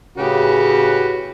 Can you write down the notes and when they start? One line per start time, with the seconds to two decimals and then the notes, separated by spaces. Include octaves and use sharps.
0.17 A2 C#3 F#4 G4 B4